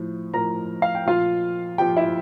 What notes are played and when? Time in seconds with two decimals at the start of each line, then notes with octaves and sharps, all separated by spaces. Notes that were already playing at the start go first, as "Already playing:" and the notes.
Already playing: A2 F3
0.33 A2 F3 A#4 A#5
0.82 F5
0.95 G5
1.06 A#2 F3 F4 F5
1.78 A#2 F3 G4 G5
1.97 E4 E5